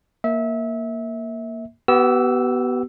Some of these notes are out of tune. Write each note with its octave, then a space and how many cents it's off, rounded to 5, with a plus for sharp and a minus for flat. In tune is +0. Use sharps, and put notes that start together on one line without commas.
A#3 +0 E5 -25
B3 +0 G4 -40 E6 +0